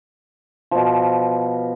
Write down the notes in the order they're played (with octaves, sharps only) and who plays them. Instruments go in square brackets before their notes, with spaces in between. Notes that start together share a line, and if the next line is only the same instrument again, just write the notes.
[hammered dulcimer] B2 F3